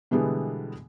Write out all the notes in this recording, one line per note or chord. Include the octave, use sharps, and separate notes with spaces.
B2 D3 E3 G3 G#3 B3